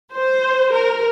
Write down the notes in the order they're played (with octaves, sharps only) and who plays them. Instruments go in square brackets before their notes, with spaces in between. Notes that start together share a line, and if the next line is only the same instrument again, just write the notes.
[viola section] C5
A#4